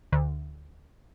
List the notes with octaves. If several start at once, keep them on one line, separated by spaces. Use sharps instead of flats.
D2